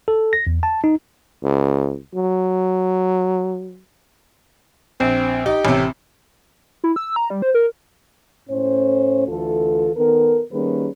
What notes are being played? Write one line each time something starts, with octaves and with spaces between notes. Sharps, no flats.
A4
A#6
E2
A5
D#4
C#2
F#3
A#1 C4
D#4 G4
A1 C3
E4
E6
A#5
G3
C5
A#4
A2 C#4 C5
D2 E3 F4 A4
D#3 B3 A4 A#4
D#3 G3 A#3 C#4 G#4 B4